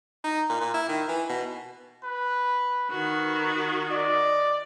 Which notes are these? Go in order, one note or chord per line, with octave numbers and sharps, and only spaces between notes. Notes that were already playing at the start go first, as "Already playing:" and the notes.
D#4
A#2
A#2
E4
D#3
E3
B2
B4
D#3 F#4 B4
D5 D#5